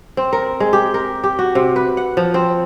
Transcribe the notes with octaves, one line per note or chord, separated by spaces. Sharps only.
C4
A#4
G#3
G4
A#4
G4
F#4
C3
B4
F#5
F3
C4